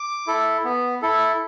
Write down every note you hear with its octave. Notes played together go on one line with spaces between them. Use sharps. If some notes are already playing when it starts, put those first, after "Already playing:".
Already playing: D6
E4 A4
B3
E4 A4